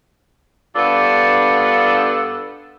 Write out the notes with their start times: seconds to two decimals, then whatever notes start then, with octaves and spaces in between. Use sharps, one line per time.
0.75 G2 B3 D4 F4 A4